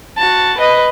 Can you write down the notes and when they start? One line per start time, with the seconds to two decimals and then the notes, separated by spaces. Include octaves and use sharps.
0.18 F#4 A5
0.58 B4 D#5